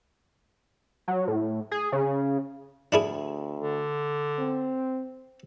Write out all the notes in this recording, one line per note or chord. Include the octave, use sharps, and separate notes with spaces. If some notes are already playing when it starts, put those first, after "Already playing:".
F#3
A2
G#4
C#3
D2 D4 E4 G#4
D3
C4